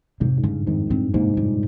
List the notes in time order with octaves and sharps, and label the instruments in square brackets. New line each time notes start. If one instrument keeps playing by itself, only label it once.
[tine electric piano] F2 G#2 [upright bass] C3
[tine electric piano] G#2
[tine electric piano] G2 [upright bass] C#3
[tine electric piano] F2 G#2 [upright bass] D#3
[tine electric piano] G2 A#2 [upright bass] C4
[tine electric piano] G#2 C3 [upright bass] A#3
[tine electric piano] G#2 [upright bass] G3
[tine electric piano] A#2